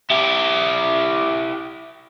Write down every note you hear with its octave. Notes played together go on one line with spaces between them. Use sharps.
E4 G4